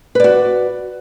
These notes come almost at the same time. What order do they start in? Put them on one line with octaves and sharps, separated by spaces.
B4 D5 F#4